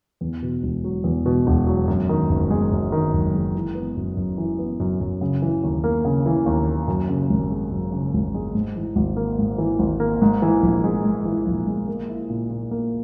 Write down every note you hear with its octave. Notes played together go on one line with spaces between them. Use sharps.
E2
B2
E1
F#3
E2
B2
E1
F#3
F#2
D#3
F#1
G#3
F#2
D#3
F#1
G#3
E3
B3
F#2
F#2
E3
B3
F#2
F#2
C#3
E3
D#2
A#3
C#3
E3
D#2
A#3
F#2
C#3
G#1
G#3
F#2
C#3
G#1
G#3
G#2
E3
G#1
A#3
G#2
E3
G#1
A#3
G#2
E3
A#1
G#3
G#2
E3
A#1
G#3
A#3
E4
A#2
A#2
A#3